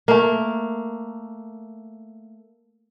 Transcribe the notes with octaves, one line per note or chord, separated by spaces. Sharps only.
A3 A#3